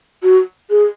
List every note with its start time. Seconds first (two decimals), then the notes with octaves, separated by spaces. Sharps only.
0.23 F#4
0.70 G#4